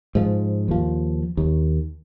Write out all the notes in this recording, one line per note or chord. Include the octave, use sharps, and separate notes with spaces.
G#2 F3
D#2 F3
D#2